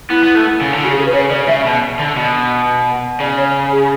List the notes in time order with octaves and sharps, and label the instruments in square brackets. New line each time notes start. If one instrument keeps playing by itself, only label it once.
[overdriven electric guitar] B3 [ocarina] E4
[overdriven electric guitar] B3
A3
C#3
D3
[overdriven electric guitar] C#3 [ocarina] F#4
[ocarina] G#4
A4
B4
[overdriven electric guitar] C#3 [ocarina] C#5
[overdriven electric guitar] C#3 [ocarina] D5
[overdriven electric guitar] C#3 [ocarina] E5
[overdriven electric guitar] B2
D3
B2
[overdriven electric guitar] C#3 [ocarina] D5
[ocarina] C#5
G#4